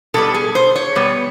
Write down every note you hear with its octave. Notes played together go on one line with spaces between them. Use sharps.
B2 G3 B3 A4
G#4
C5
C#5
B2 G3 B3